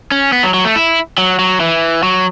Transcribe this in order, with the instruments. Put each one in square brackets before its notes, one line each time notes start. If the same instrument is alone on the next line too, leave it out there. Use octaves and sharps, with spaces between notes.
[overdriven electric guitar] C#4
B3
F#3
F#3
A3
E4
F#3
F#3
E3
F#3